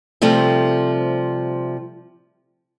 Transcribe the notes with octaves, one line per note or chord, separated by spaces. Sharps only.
C3 F3 G3 A3 C4